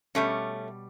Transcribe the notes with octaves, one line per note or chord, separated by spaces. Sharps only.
B2 G3 A3 C#4